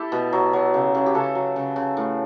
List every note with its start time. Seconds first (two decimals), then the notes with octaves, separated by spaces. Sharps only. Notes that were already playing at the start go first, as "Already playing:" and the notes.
Already playing: E4 G4 A4
0.12 B2
0.33 F#3
0.53 F#3
0.74 C#3
0.95 C#3
1.06 G4
1.14 C#3 F#4 A4
1.35 F#3
1.56 C#3
1.76 C#3
1.97 A2